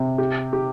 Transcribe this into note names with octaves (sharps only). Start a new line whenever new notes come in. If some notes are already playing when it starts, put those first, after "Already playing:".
Already playing: C3
G4
G4